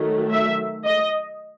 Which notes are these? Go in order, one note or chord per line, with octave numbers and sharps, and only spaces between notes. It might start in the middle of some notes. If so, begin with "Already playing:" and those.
Already playing: D#3 F#3 A3
E5
D#5